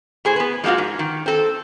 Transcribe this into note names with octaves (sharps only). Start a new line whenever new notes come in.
A2 G#4 C5
B3 B4
F3 G#3 A#3 F4 F#4
G#2
D#3
C4 A4